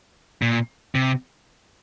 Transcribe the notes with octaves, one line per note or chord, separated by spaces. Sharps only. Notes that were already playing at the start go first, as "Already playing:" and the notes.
A#2
C3